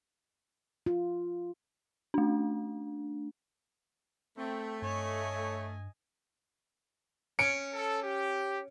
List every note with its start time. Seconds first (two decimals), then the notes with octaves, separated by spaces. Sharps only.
0.86 F4
2.14 A3 D4
4.37 A3 C4 G5
4.82 G2 C#5 D#5 G#5
7.39 C#4 C#7 D7
7.74 A4
8.03 G4